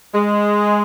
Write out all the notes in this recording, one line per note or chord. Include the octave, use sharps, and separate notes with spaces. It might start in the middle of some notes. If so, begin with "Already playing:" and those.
G#3